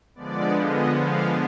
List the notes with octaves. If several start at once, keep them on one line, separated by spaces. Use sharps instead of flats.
D3 F3 G#3 B3 D5
D#5
F5